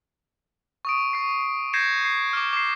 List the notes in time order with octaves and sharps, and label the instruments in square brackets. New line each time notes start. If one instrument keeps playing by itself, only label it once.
[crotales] C#6 D#6 D7
C#6 C7
G6 G#6 A#6 C7 C#7 E7
C7
D6 F6
D6 C7